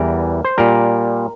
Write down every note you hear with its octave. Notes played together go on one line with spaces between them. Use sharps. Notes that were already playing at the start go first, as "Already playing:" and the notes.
Already playing: E2 E3 G3 A#4
C5
A#2 G3 A#4